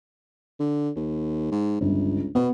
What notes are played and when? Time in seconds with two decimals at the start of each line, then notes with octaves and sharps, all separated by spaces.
0.60 D3
0.96 D#2
1.51 G#2
1.81 G1 C#2
2.35 B2 B3